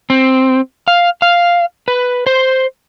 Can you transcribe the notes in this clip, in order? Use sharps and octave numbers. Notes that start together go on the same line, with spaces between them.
C4
F5
F5
B4
C5